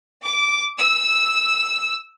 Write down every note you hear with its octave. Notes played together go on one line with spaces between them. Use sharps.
D6
E6